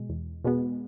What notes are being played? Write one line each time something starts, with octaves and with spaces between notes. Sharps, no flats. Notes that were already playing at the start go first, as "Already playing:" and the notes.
Already playing: B2 G#3
E2
B2 G#3 B3